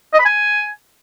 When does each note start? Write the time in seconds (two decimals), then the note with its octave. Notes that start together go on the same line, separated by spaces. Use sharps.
0.14 D#5
0.20 B5
0.25 G#5